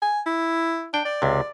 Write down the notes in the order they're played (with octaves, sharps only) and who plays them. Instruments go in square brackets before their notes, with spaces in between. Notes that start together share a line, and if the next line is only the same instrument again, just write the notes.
[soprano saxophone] G#5
E4
[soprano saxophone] D4 [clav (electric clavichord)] G5
[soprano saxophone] D5
[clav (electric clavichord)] C#2 C3